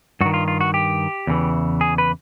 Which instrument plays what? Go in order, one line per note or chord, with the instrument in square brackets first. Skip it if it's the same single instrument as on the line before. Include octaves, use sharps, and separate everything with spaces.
[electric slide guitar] G2 F#4
D#3
F4
F4
F#4
G4
E2 C#3 E3
G#4
B4